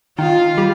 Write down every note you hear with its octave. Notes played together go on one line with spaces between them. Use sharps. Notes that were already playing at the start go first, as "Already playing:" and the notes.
D#3 F4
G3